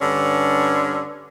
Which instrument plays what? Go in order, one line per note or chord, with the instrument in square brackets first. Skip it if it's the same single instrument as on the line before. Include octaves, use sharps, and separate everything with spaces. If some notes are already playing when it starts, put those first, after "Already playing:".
[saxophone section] G2 D3 C#4